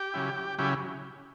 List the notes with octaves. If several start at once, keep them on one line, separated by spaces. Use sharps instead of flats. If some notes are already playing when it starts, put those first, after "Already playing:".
Already playing: G4 G5
C#3 F#3 C#4 E4
C#3 F#3 C#4 E4 G4 G5